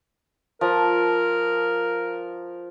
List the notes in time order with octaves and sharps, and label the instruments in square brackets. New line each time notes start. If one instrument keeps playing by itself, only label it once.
[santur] F3 [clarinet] A#4